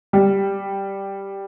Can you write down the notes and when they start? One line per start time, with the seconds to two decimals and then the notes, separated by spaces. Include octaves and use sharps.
0.13 G3